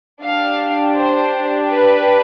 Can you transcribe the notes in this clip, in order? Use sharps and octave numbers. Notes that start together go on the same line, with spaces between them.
D4 G4 F5
C5
B4